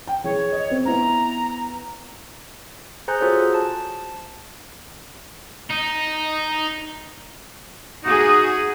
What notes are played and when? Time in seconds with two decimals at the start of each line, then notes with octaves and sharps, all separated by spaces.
0.07 G5
0.24 E3 G#4 C#5
0.52 D#5
0.71 C4
0.85 B3 E4 A#5
3.08 G#4 C5 G#5 A#5 F#6 G6
3.21 F4 F#4 G#4 A4 C5 C#5
3.54 A5
5.71 D#4
8.04 D#4 F#4 G#4